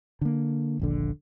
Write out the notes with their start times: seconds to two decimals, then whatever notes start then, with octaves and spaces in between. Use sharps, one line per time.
0.21 D3 A#3
0.79 D#1 A#1 D3